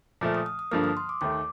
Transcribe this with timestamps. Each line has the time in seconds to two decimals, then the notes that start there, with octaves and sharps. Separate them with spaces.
0.21 A#2 F3 A3 F6
0.35 D#6
0.46 D#6
0.59 D#6
0.71 G2 D3 F3 A#3 F6
0.84 D#6
0.97 C6
1.09 D6
1.21 D#2 D#3 A3 D6